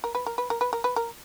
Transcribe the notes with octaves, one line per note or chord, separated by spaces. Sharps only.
A#4
B4
A#4
B4
A#4
B4
A#4
B4
A#4